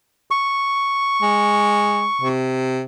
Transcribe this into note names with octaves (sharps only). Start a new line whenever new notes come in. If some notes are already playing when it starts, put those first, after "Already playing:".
C#6
G#3
C3